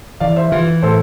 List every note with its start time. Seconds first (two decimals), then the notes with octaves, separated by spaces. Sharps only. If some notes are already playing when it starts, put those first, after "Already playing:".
0.20 E3 D5 F5
0.36 C5 E5
0.52 E3 F4
0.83 A2 A4 C5